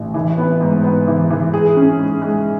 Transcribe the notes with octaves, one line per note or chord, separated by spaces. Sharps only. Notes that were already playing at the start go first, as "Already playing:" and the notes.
Already playing: A1
E3
B3
G#2
B3
E3
E3
G#4
C#4
G#3
G#3